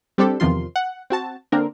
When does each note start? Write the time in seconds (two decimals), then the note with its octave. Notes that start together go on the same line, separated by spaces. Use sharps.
0.18 G3 C4 D4 G4 A4
0.40 E2 C3 D#3 F3 F4 C6
0.76 F#5
1.10 C4 F#4 A5
1.52 D3 A#3 C4 D4 A#4